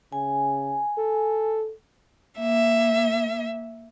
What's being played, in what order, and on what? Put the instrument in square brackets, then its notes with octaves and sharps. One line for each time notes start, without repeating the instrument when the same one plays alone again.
[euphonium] C#3 [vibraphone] G#5
[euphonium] A4
[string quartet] A#3 E5